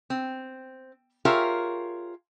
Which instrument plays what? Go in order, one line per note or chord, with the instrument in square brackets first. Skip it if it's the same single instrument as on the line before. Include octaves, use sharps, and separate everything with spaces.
[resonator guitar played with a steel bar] C4
F4 G4 G#4 A#4 C#5 E5